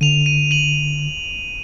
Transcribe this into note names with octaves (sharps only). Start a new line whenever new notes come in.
D3 D#7 F7
D#7
D#7 F#7